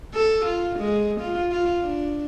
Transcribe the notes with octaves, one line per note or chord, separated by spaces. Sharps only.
A4
F4
G#3
F4
F4
D4